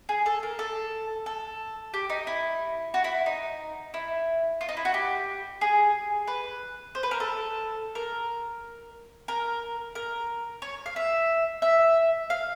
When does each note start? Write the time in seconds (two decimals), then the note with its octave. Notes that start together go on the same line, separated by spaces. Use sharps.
0.09 G#4
0.26 A4
0.43 A#4
0.59 A4
1.26 A4
1.94 G4
2.10 D#4
2.27 E4
2.94 F#4
3.04 E4
3.26 D#4
3.94 E4
4.61 F4
4.69 D#4
4.77 E4
4.85 F#4
4.94 G4
5.61 G#4
6.27 B4
6.95 C5
7.03 B4
7.11 A#4
7.20 A4
7.95 A#4
9.28 A#4
9.95 A#4
10.62 C#5
10.86 F5
10.96 E5
11.62 E5
12.30 F5